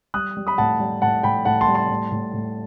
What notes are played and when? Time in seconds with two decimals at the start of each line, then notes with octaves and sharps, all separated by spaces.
0.14 G3 D#6 F#6
0.37 G3
0.47 B5 D#6
0.58 A2 F#5 A5
0.80 G3
1.02 A2 F#5 A5
1.23 A2 G5 B5
1.45 A2 F#5 A5
1.61 A5 C6
1.68 G3
1.75 A5 C6
1.89 A2
2.12 A2
2.33 A2